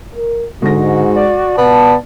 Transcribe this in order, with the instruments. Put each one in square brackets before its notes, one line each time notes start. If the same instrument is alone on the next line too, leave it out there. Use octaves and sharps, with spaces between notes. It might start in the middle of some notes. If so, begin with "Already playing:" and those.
[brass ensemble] A#4
[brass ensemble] G#2 [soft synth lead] D3 [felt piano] G#3 A#6 [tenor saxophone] F#4
[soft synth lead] D5
[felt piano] B2 [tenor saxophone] B3 [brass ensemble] A5